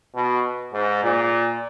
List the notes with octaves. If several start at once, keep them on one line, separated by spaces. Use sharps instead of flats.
B2
G#2
A#2